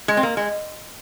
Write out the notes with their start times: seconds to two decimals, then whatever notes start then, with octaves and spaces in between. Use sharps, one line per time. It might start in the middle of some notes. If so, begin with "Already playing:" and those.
0.08 G#3
0.17 C4
0.23 A#3
0.37 G#3